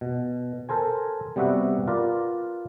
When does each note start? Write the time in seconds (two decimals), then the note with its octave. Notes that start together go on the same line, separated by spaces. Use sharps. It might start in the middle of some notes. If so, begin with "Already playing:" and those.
0.01 B2
0.69 A4 A#4 C5 G#5
1.36 C3 G3 B3 F#4 E5 F#5
1.87 F4 A#4 B4 D5